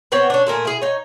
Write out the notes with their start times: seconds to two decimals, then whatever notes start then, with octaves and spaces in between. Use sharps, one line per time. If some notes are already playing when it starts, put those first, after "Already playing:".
0.12 B3 C4 B4 C#5
0.30 C#4 D4
0.47 A#2 A3 A#4 G#5
0.65 E4 G#4
0.81 D#4 C#5